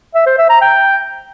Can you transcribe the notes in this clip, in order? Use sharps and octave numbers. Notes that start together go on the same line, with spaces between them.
E5
C5
E5
A#5
G5